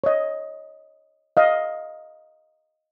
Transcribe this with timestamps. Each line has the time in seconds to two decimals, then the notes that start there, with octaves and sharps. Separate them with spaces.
0.04 C#5 D#5
1.37 D#5 F5